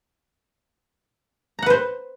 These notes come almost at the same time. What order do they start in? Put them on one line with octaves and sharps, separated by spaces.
A#5 F#5 B4 C5